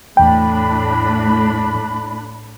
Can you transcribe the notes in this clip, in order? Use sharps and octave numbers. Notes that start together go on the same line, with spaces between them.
E2 A2 D4 G5 B5